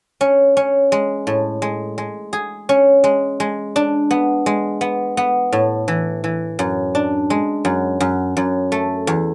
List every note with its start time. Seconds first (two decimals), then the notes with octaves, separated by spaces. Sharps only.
0.21 C#4
0.57 C#4
0.92 G#3
1.27 A2
1.62 G#3
1.98 G#3
2.33 G#4
2.69 C#4
3.04 G#3
3.40 G#3
3.76 D4
4.11 B3
4.46 G#3
4.81 B3
5.17 B3
5.52 A2
5.88 E3
6.24 E3
6.59 F#2
6.95 D4
7.30 G#3
7.65 F#2
8.00 F#2
8.37 F#2
8.72 A3
9.07 E2